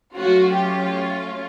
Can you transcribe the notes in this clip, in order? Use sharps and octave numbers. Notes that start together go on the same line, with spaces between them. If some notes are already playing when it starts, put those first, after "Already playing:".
F#3 A3 C#4 F4 F#4
G4